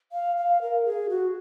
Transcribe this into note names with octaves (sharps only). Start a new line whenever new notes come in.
F5
F5
A#4
G#4
F#4